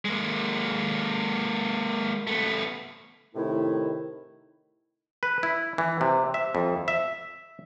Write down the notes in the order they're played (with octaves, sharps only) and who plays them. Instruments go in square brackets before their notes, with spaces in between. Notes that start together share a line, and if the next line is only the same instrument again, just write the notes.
[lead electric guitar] G#3 A#3
A3 B3
[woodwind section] A2 C3 D#3 A3 E4
[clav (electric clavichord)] B4
E4
E3
C3
E5
F2
E5